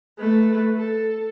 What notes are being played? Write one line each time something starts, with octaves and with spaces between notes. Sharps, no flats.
A3 B4
A4